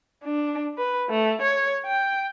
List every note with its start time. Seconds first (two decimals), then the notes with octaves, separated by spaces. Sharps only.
0.25 D4
0.78 B4
1.10 A3
1.42 C#5
1.86 G5